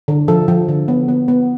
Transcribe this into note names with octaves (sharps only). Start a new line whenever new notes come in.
D3
F3 A4
F3
D3
B3
B3
B3